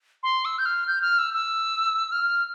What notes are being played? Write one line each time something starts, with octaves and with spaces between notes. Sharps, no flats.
C6
E6
G6
F6
G6
F6
E6
E6
F6